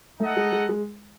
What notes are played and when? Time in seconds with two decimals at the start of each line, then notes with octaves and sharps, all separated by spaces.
0.20 A3 D#4 A4 D#5 F#5
0.36 G#3
0.52 G#3
0.69 G#3